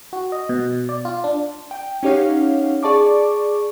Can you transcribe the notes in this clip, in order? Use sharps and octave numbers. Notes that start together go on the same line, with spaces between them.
F#4
D#5
B2
D5
F4
D4
G5
C#4 D#4 G4 C#5 F5 F#5
G#4 D5 A5 C#6 D6